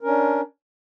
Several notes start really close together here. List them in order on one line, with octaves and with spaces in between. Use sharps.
A#4 C#4 D4